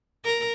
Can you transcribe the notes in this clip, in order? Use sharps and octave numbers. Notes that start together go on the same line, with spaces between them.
A#4